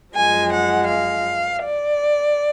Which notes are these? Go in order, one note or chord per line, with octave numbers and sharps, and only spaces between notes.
F#2 F3 G#3 G#5
F#5
F5
D5